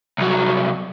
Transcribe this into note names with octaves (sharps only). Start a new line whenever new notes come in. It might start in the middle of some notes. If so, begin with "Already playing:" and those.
C2 F#3